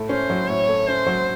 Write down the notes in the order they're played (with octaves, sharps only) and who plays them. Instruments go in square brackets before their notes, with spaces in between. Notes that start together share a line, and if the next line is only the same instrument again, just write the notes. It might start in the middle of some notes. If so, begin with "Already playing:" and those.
Already playing: [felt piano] A2 A3
[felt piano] C#4 [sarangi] C5
[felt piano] F#3
[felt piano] A2 [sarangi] C#5
[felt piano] A3
[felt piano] C#4 [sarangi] C5
[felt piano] F#3